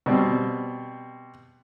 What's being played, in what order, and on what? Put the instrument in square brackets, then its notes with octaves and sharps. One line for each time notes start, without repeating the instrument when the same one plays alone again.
[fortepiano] B2 G3 C4